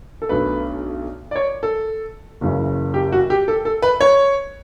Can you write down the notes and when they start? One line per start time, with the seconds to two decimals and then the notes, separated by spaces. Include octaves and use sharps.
0.22 A4
0.29 B1 B2 A3 D4 B4
1.31 D5
1.36 C#5
1.63 A4
2.41 F#1 F#2 C#3 E3
2.94 G4
3.12 F#4
3.30 G4
3.48 A4
3.65 A4
3.82 B4
4.01 C#5